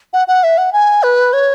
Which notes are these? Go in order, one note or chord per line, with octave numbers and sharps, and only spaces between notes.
F#5
F#5
E5
F#5
G#5
B4
C#5